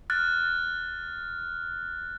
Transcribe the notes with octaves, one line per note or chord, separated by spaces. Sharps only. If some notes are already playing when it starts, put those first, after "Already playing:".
F6 F#6 A6